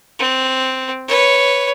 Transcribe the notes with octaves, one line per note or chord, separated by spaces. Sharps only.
C4
B4 C#5